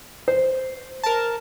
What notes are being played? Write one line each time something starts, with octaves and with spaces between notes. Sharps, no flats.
C5
A#4 A5